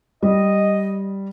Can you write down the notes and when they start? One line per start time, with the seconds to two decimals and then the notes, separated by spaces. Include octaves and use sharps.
0.23 G3 D#5